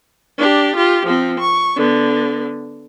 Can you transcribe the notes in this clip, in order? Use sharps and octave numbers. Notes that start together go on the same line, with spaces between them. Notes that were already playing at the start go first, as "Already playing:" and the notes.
D4 G4
F4 G4
F3 C4
C#6
D3 B3